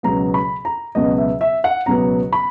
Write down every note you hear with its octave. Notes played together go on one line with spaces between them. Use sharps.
C#2 B2 F#3 B3 A#5
B5
A#5
C#2 B2 F#3 B3 D#5
E5
E5
F#5
C#2 B2 F#3 B3 A#5
B5